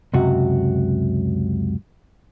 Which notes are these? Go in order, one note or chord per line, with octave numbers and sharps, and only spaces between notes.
C#2 F#2 C3 F#4